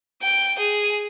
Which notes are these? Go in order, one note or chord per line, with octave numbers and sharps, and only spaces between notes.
G5
G#4